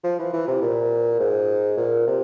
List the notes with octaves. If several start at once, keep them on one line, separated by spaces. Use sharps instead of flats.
F3
E3
E3
C3
A#2
G#2
A#2
C3